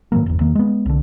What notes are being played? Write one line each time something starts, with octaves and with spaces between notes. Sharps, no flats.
G#2 D#3 F#3 A#3
G1 E2
E2 D#3 A#3
G#3 B3
C2 D3